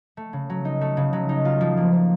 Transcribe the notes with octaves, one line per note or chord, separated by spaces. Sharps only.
A3
C#3
F#3
D#4
A3
C#3
F#3
D#4
F4
F3
A#3
F3